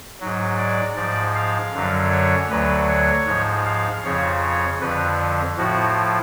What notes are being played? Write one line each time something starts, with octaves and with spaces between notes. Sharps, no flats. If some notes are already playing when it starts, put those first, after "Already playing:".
G#2 F#3
D5
G#2 F3 D5
F5
F#2 D3 F#3
C#5
D2 D3 F#3 B4
C#5
G#2 F3
F5
F2 C#3 F3 C#5
C#5
F2 D3 F3 B4
A2 F3 F#4